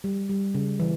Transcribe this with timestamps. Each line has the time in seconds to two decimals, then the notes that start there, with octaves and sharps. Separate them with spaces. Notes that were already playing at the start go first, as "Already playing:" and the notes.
0.04 G3
0.29 G3
0.55 C#3
0.80 E3